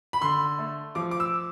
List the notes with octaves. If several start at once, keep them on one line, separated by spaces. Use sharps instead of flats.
B5
D3 C6
A3
F3 D6
D6
E6